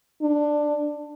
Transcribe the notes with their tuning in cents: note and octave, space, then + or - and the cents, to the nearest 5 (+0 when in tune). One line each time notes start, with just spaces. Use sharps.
D4 +10